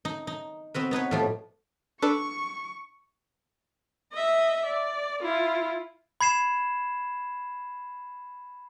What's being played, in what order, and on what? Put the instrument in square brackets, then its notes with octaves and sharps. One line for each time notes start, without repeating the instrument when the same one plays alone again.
[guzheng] D#4
D#4
B3 C4 F#4 B4
B3 D#4 B4 C#5
A2 F3 G3
[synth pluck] D4 A4 B4 [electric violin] C#6
[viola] D#5 E5
D5
E4 F4
[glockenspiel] B5 G#6 C7 E7